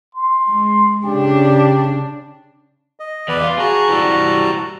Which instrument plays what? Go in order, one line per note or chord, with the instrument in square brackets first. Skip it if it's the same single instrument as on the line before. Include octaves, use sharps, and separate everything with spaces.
[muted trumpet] C6
[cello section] G#3
[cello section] C#3 D4 [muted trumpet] G4
[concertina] D#5
[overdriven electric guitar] E2 [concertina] B4 D5
[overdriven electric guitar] F4
[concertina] F#4 A5 A#5 [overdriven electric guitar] G#4
[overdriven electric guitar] E3 G3